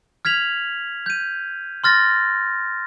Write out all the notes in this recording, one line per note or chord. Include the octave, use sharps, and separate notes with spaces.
F6 G#6 B6 F7 F#7
G6 D#7
C6 F6 A6 A#6